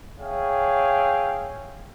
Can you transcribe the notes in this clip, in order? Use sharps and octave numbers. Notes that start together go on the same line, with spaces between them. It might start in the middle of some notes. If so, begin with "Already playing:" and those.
G#4 C#5 E5 F5 G5